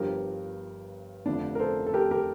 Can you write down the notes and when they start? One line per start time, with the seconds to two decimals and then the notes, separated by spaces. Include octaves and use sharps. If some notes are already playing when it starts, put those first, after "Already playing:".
Already playing: G1 G2 F3 G4 A#4
1.26 F1 F2 D3 F3 D4
1.55 A#4
1.59 A4 C5
1.87 A4
1.94 G4 A#4
2.11 G4 A#4